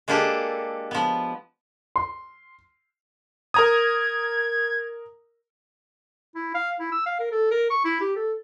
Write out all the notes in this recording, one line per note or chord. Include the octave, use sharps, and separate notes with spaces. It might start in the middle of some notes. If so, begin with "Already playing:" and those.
G#3 A#3 D4 F4 G4 A4
F3 B3
C6
A#4 A#5 D#6 G#6
E4
F5
E4
E6
F5
A#4
A4
A#4
C#6
E4
G4
A4